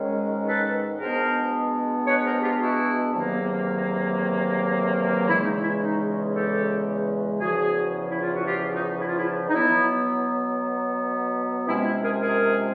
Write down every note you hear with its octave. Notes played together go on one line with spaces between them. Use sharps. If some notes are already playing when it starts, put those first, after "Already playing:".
Already playing: G#2 D#3 G#3 C#4
A4 B4
B2 G#3 B3 D4 A#4 C5
B4 C#5
A#4 C5
F4 G4
E4 F#4
E2 C3 D#3 F#3 A#3
E2 C#3 E3 G#3 E4
D#4
E4
D#4
G4 A4
E2 C#3 F3 F#4 G#4
E4
F4
F#4
F4 G4
D#4 F4
E4
F4
E4
D#4
B2 F#3 B3 E4
C3 F3 G#3 C#4 E4
E4
G#4 A#4
G#4 A#4